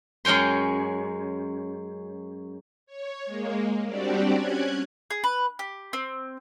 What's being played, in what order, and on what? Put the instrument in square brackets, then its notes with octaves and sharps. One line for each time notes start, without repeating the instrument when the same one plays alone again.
[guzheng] F#2 G#3 C#4 G5 C6
[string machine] C#5
G#3 A#3
G3 C4 D4 F#4 G4 D5
C#4 F#6 G#6
[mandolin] G#4
B4
G4
C4